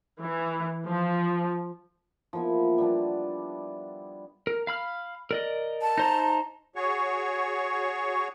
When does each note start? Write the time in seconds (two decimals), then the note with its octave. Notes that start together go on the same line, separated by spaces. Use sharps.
0.21 E3
0.87 F3
2.33 F3 A#3 B3 E4
2.78 G3 B3 D4
4.47 A#4
4.67 F5 B5 F6
5.31 A#4 D5 D#5
5.82 A5
5.98 D#4 C5 A#5
6.76 F#4 G#4 C#5 C#6